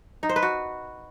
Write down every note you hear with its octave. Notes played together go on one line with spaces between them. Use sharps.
D#4
C5
B4
F#4